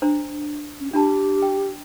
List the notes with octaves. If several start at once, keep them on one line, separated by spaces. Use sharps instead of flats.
D4 C5 A#5
C#4
D4 F4 G4 A5
G5